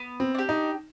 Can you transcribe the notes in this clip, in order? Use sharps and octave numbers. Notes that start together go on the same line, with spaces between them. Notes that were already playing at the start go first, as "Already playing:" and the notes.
Already playing: B3
C4
D4 G4
D#4